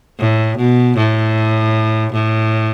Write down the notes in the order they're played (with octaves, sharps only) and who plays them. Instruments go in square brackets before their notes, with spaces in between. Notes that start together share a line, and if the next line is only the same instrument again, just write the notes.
[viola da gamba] A2
B2
A2
A2